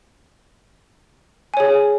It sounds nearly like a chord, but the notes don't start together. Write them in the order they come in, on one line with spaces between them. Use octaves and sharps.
G#5 C#5 G#4